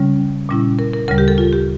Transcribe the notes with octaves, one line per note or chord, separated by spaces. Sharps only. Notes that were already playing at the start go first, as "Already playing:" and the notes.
Already playing: C#3 G3 C#4
A#2 G3 C#4 E4
A#4
A#4
D2 C#3 G3 A#4
G4
A4
F4
G4